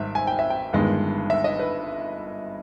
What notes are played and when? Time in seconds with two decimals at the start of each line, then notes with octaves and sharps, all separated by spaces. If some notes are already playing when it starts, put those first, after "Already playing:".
Already playing: G#1 G#2 G3 E5
0.15 G#5
0.27 G5
0.39 E5
0.50 G5
0.73 G1 G2 D#3 G#3
1.30 E5
1.44 D#5
1.59 B4